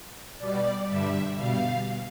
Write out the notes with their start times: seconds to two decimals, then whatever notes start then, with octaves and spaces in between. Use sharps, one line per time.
0.39 B2 G3 D5
0.88 G2 D3 G3 E5
1.36 B2 G3 F5